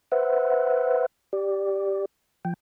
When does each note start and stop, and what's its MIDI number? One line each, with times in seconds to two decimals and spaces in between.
0.12 1.06 71
0.12 1.06 72
0.12 1.06 76
0.12 1.06 78
1.33 2.05 67
1.33 2.05 74
2.45 2.53 53
2.45 2.53 79